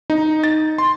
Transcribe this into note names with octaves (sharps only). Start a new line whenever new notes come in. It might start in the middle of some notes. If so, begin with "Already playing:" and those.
D#4
A6
C6